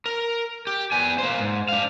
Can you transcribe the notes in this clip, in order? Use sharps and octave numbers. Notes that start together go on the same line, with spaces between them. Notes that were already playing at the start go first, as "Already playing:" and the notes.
A#4
G4
B3 G#5
A#3 C5
G#2
D4 F5